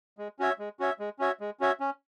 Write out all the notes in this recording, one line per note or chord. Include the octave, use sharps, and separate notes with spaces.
G#3
C#4 F#4 C#5 E5
G#3
C#4 F#4 C#5 E5
G#3
C#4 F#4 C#5 E5
G#3
C#4 F#4 C#5 E5
C#4